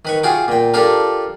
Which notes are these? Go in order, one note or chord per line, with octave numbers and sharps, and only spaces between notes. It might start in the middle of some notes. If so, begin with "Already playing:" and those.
D#3 B4 C#6
F4 F#4 G#4 G5 D6
A#2 G5
D4 F4 G4 A4 A#4